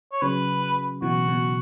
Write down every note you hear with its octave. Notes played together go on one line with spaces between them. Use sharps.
C#5
C#3 F#3 B4
B2 E3 F#4
B2